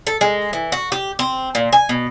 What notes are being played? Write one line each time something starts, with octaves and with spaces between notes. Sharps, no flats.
A4
G#3
E3
F#4
G4
C4
A#2
G#5
B2